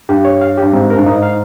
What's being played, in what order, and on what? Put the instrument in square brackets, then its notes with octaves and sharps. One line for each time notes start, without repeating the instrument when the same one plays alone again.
[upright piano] G2 [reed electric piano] G4
[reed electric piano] C#5
F5
[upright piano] G2 [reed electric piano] G4
[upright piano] G#2 [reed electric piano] C4
[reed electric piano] A#4
[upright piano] G2
[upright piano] G#2 [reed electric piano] D#4
[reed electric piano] F5